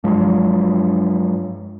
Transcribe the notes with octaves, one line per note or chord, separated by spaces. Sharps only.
G2 F3 F#3 G#3